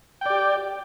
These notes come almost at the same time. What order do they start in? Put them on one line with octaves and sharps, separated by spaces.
G5 D5 G4